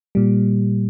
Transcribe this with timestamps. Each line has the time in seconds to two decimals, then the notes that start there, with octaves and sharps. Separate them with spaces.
0.15 A#2 G3